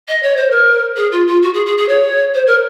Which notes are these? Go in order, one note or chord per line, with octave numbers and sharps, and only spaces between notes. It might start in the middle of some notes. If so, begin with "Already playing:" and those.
D#5
C#5
C5
A#4
G#4
F4
F4
F#4
G#4
G#4
G#4
C#5
C5
A#4